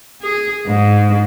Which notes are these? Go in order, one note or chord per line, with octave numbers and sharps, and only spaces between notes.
G#4
G#2